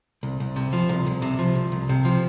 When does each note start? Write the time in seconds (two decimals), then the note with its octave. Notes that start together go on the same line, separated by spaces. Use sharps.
0.23 C2
0.40 C2
0.56 C3
0.73 F3
0.89 C2
1.06 C2
1.22 C3
1.39 F3
1.56 C2
1.72 C2
1.89 C3
2.05 F3